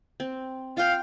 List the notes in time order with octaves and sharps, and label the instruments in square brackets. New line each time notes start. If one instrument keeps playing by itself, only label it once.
[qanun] C4
[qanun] F4 G5 [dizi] F5